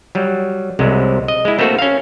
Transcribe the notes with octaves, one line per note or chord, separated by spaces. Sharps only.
F#3 G3
C2 C3 F#3 G#3
D#5
G#3 E4
A3 A#3 C4 F#4 A4
C#4 F5